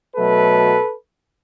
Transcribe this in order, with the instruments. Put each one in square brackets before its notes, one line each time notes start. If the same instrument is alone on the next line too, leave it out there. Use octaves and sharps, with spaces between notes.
[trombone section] B2 F#3 A3 A4 B4